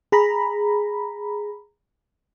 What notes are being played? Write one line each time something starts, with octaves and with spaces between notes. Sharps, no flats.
G#4 A#5 B5